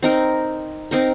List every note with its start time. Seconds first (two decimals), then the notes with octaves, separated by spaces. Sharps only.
0.03 C4 D#4 A#4
0.91 C4 D#4 A#4